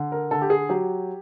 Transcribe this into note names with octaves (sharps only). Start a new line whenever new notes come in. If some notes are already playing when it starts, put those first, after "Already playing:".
Already playing: D3
A#4
D3 A4
G4
G#4
F#3 G4